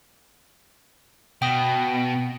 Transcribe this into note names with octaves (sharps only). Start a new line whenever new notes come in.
B2 G5 D#6